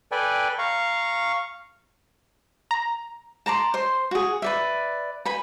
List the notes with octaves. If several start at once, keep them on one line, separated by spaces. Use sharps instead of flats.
A4 B4 D5 G5 G#5
F5 A#5 C#6
A#5
A5 A#5 C6 D6
C5 C6
F#4 G#4
B4 D5 E5
B4 G#5 B5